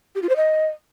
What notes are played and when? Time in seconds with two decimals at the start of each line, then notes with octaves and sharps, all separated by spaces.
0.15 G4
0.22 F4
0.29 C5
0.36 D#5